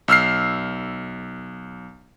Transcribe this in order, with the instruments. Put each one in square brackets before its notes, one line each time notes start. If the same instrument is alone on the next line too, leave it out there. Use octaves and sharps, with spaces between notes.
[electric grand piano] B1 E6 F6 C7